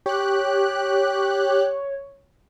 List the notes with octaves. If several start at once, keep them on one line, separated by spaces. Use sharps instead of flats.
G4 C#5 F#6